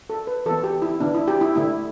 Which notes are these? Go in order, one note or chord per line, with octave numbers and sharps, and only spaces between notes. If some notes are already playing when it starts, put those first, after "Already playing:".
A4
B4
E3 B3 A4
G4
E4
D3 B3 D4
E4
G4
E4
D3 A3 E4